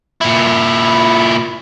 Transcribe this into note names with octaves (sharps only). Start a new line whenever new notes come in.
A#2 E4